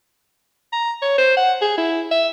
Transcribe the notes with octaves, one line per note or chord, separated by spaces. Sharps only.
A#5
C#5
C5
F#5
G#4
E4
E5